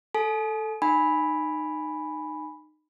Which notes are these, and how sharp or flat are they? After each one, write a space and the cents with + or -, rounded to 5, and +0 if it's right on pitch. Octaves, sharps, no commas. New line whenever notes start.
A4 +0 G#5 +45
D#4 -25 G#5 +0 B5 +0